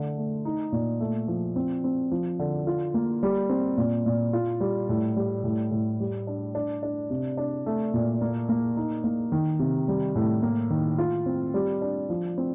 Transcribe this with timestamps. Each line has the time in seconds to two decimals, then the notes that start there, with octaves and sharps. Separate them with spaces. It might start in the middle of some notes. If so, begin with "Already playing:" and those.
Already playing: D3 A3
0.18 A3
0.45 D#4
0.72 A#2
1.00 A3
1.28 F3
1.56 C4
1.84 C4
2.11 F3
2.39 D3
2.67 F4
2.94 A#3
3.23 G3
3.49 C4
3.78 A#2
4.06 A#2
4.33 F4
4.61 G3
4.89 A2
5.16 G3
5.44 A2
5.71 A2
6.00 G3
6.27 D4
6.55 D4
6.83 D4
7.10 C3
7.37 D4
7.66 A3
7.94 A#2
8.21 A#3
8.49 A#3
8.77 D#4
9.04 A#3
9.32 D#3
9.59 C3
9.88 G3
10.15 A2
10.42 A#3
10.70 D#3
10.98 F4
11.26 C4
11.54 G3
11.82 D4
12.10 F3
12.38 C4